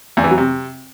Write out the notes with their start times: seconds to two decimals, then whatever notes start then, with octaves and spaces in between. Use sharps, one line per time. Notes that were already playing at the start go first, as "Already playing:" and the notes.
0.17 E2
0.24 E3
0.31 F#3
0.38 C3